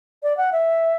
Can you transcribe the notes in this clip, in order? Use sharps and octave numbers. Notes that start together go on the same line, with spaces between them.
D5
F#5
E5